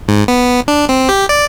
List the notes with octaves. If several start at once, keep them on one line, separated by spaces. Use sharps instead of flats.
G#2
B3
D4
C4
G4
D5